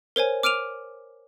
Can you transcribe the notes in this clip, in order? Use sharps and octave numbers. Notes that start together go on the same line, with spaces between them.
A#4 C5 C#5 G#5
D6 F6 D7 D#7 F7